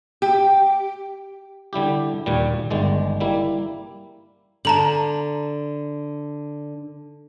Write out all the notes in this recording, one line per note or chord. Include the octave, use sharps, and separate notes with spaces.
G4
D3 G3 E4 G4
D#2 A#2 G3
G1 D#3 G#3 D5
G3 A#3 E4
D3 A5 A#5 F#7